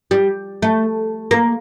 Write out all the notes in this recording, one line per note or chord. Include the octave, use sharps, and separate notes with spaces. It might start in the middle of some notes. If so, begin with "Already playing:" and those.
G3
A3
A#3